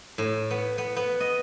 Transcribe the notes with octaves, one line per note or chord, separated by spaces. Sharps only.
A2
B3
B3
B3
D#5